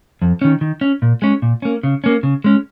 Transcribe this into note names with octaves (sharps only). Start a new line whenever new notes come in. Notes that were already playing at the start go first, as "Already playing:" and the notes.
F2
D#3 C#4
D#3
C#4
A#2
G#3 C#4
A#2
A#3 C#4
C#3
A#3 C#4
C#3
G#3 C#4